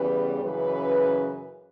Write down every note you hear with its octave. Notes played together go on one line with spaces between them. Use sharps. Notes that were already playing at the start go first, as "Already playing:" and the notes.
Already playing: E2 C#3 E3 G3 B4
F#2 C#3 E3 B4